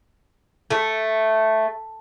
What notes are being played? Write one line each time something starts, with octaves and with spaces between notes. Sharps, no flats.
A3